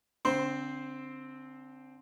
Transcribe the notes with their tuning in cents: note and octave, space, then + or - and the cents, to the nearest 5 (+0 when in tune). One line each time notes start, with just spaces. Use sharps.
D3 -30 C4 +0 C5 +0